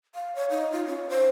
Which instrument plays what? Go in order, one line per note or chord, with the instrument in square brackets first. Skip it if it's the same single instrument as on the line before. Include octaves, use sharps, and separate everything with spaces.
[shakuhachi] F5
C#5
D#4
F4
C#4
C5